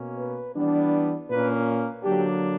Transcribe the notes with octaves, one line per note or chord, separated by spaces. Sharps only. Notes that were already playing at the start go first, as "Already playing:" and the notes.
Already playing: B2 A#3 C#4
B4
E3 G3 B3 D4
A#2 A#3 C#4 B4
D3 F#3 A#3 D4 G4